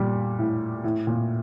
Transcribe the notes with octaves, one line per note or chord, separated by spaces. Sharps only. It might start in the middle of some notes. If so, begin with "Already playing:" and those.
Already playing: A#2 G3
A2
A2
A#2